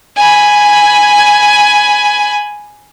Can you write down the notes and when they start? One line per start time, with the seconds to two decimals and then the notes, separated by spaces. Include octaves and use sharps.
0.17 G#5 B5